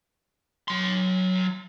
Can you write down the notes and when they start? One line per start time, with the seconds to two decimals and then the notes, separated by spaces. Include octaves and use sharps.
0.68 F#3 C6